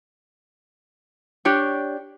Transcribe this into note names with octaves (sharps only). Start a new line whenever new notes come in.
D4 G4 C#5